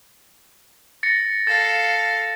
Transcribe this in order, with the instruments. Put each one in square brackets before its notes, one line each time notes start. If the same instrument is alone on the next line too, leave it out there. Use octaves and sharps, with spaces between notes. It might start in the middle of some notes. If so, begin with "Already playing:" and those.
[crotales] A6 A#6 C#7
[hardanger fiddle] A4 F5 [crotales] A6